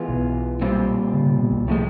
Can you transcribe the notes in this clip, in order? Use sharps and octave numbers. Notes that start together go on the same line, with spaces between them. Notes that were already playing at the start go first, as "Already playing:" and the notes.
Already playing: E3 G#3 B3 F4
B1 B2
A#2 G3 C4 F4
C#3
C3
B2
C2 C3
A2 F3 G#3